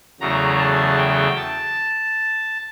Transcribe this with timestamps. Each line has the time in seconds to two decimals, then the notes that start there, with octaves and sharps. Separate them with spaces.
0.20 E2 C#3 F#3 A3 A#5
0.58 A5
0.97 G5
1.36 A5